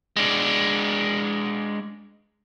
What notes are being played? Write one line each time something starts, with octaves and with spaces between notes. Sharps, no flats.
G#3 D4